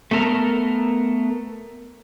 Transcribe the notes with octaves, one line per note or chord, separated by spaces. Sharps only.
A3 B3 A4 A#4